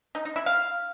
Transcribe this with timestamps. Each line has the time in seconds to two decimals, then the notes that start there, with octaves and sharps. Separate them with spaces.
0.15 D#4
0.25 D#4
0.36 E4
0.46 F5